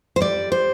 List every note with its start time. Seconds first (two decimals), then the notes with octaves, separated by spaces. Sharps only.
0.16 C5
0.20 G3 D5
0.52 C5